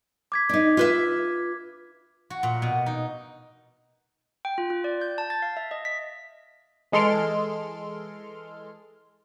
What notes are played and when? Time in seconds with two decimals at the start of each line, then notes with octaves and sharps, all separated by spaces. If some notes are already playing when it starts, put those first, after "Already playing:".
0.32 D6 G#6 B6
0.49 D4 D#4
0.77 F4 B4 E5
2.30 F#4
2.43 A#2
2.62 B2
2.86 D#4
4.45 G5
4.58 F4
4.70 F4
4.84 D5
5.01 G6
5.18 A5
5.30 A6
5.42 F5
5.57 E5
5.71 D#5
5.85 B6
6.92 E3 G#3 A4 C6 F6 D7